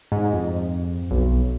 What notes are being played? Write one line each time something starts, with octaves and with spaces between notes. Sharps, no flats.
G#2
F2
B1